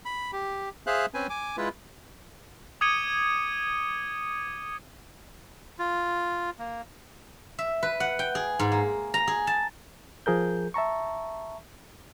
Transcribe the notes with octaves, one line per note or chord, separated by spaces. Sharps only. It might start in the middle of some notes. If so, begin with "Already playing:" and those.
B5
G4
G#4 C5 E5 F5 F#6
C4 C#4 B4 C5 G#5
G#5 D6
G#3 E4 F4 B4
D6 D#6 G#6 C#7 D#7 G7
F4
A#3
E5
B4
F#5
G5
G#4
G#2
A#3
A#5
G#4
A5
F3 G#4 A#4 G6
E5 A5 A#5 C#6